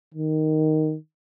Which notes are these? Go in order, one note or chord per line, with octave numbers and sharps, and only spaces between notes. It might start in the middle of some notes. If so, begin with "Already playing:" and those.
D#3